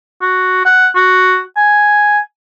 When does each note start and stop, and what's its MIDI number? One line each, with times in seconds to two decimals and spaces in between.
0.22 0.62 66
0.65 0.88 78
0.95 1.39 66
1.56 2.19 80